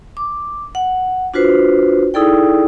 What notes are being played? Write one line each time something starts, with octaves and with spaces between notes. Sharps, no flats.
D6
F#5
D4 F4 F#4 B4 C5
D#4 E4 G#4 A4 D5 G5